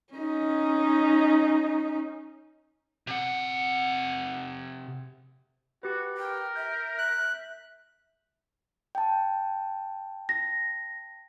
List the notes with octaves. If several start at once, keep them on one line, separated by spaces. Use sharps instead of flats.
C#4 D#4
C3 F#5
F#4 G4 B4
A#4 G5
E5 G6
F#6
G5 A5
A#6